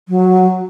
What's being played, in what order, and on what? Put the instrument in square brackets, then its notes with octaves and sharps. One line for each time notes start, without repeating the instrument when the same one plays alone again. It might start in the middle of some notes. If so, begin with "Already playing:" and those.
[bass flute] F#3